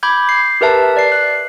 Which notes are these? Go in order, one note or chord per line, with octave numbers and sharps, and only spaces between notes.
B5 D6 G6 G#6
C7
G4 A#4 B4 E5 A5
D5 C7
F#6